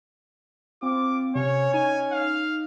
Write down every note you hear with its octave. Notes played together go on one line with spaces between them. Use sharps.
C4 F4 D6
C3 C#4 C#5
D#4 G#5
F5